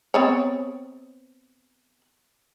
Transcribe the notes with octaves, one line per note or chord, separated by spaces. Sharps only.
B3 C4 C#5